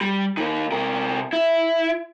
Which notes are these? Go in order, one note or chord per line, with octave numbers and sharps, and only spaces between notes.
G3
D#3 A#3
C3 A#4
E4